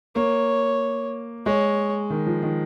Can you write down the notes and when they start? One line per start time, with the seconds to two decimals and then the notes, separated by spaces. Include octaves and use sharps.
0.15 A#3 C#5
1.46 G#3 C#5
2.10 D#3
2.26 F3
2.43 D#3